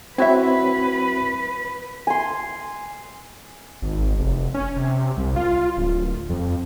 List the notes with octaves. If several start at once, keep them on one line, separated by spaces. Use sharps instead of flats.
C4 E4 F#4 B4 C#5 E5
G#5 C6
G#1
F1
C#4
C3
C2
F4
D1
F2